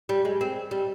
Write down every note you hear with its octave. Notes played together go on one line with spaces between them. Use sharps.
G3
G#3
C4
G3